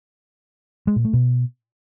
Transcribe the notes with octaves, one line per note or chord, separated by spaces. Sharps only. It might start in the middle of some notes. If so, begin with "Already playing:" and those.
G#3
A#2
A3
B2